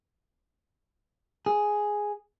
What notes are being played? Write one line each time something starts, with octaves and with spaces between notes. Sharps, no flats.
G#4